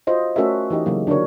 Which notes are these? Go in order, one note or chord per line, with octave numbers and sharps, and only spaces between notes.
F4 F#4 C5 D#5
A3 C#4 F#4 A4 A#4 E5
E3 D#4 G4 D#5
C#3 F#3 A#3
D3 D4 F#4 A#4 C#5